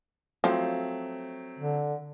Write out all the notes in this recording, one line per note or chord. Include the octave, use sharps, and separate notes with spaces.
F3 F#3 A3 C4
D3